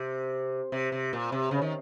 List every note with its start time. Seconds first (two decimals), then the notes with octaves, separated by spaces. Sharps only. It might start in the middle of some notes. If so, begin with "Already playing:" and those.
Already playing: C3
0.72 C3
0.92 C3
1.13 A#2
1.32 C3
1.51 C#3
1.62 D#3